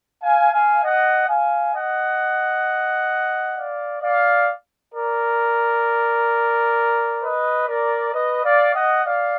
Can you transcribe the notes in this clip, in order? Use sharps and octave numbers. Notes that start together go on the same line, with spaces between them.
F5 G#5
F5 G#5
D#5 F#5
F5 G#5
D#5 F#5
D5 F5
D5 F5
A#4 D5
B4 D#5
A#4 D5
B4 D#5
D5 F5
D#5 F#5
D5 F5